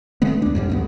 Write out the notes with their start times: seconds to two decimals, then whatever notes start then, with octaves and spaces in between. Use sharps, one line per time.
0.22 D3 G#3 A3 B3
0.42 D#2 D4
0.55 F2 G#2 G3
0.70 D2 A3 B3